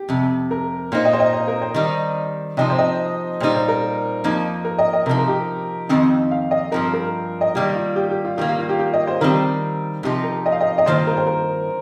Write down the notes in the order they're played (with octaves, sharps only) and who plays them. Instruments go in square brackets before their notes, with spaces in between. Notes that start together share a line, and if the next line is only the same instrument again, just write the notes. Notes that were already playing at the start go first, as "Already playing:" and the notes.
Already playing: [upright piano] G4
[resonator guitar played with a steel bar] F2 C3
[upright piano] A#4
[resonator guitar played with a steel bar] A#2 A#3 D#4 [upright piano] C5
[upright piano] D#5
C5
D#5
C5
A#4
C5
[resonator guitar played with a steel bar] D#3 G3 D#4
[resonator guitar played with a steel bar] C3 F3 C4 D#4 [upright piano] D#5
[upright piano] C5
D#5
[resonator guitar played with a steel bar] A#2 G3 D#4 [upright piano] C5
[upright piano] C5
A#4
[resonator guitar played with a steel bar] F2 F3 A#3 D#4
[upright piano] A#4
D#5
D#5
[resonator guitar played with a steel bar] C3 [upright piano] A#4
[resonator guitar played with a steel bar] F3 D#4
[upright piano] A#4
G4
[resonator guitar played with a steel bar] F2 C3 D#3 C4 D#4
[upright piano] F5
D#5
[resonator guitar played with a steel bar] G2 F3 C4 [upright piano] A#4
[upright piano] A#4
D#5
[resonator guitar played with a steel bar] D#3 G3 A#3 [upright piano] G4
[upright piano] F4
G4
G4
F4
[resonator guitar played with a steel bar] D#3 G3 A#3 [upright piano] G4
[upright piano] F5
F4
G4
G4
D#5
C5
[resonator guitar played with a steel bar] D#3 G3 C4 [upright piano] A#4
[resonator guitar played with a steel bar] C3 F3 D#4 [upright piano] G4
[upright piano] A#4
D#5
F5
D#5
D#5
[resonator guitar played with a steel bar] G2 D#3 A#3 F4 [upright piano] C5
[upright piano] A#4
C5
A#4